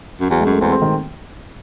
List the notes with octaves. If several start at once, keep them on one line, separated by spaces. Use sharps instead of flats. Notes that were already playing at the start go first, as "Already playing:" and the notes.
F#2
E2 F#3
G#3
F#2 A3
E2 C4
C4
D#3